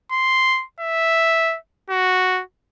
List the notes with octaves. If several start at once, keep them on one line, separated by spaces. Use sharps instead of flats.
C6
E5
F#4